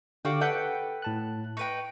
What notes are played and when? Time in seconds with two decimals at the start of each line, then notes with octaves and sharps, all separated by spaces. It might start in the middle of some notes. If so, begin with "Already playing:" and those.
0.25 D3 F#4 G4 D5 F5 G5
0.41 A4 B4 F#5 G5
1.02 A2 A5 F#6
1.57 D#4 B4 G5 C#6